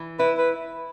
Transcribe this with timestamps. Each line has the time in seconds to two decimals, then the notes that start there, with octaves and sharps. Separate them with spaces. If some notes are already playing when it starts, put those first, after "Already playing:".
Already playing: E3
0.19 E4 B4
0.38 B4